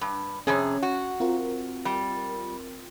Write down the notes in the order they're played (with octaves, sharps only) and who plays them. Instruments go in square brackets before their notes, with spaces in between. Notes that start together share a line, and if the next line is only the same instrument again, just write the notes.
[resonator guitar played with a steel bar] G2
[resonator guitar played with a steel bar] F2 C3 G#4 [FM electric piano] C#4
[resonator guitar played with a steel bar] F#4
[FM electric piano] C4 F4 A#4
[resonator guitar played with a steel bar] G3